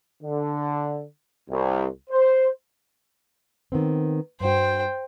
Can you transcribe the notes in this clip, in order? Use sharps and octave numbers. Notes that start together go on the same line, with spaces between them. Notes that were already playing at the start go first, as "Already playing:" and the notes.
D3
C2
C5
D#3 B3 C4
G2 F#4 C5 G5